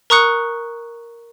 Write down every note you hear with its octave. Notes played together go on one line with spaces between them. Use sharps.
A#4 A#5 C#6 D#6 F#6 C#7